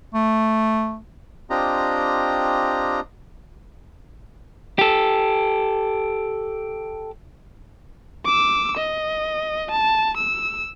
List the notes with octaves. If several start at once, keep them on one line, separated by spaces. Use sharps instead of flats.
A3
C4 D4 F4 G4 D#5 A#5
G4 A4
D6 E6
D#5
A5
E6